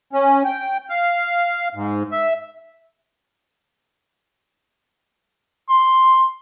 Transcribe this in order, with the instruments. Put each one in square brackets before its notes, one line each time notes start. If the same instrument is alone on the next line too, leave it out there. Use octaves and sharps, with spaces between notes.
[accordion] C#4
G5
F5
G#2
E5
[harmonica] C6